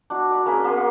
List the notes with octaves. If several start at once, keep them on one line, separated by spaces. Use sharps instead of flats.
D4 F#4
D5 B5
A#3 C#4 G#4 B5
A#3 B3 C6
F#5